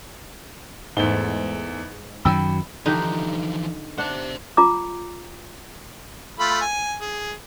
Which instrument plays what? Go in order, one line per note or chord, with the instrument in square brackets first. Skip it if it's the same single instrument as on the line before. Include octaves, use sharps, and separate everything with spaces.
[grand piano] E2 A3 G7 [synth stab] G#2
[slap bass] F#2 D#3 F#3 [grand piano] G5 B5 E6
[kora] D3 G4 [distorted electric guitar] E3 F3 [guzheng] D#4
[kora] D4 F#5 [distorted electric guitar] C5 E5
[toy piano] F4 A#5 D6
[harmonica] A3 F4 B5
G#5
G#4